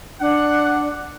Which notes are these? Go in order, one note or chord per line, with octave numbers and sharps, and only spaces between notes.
D4 F#5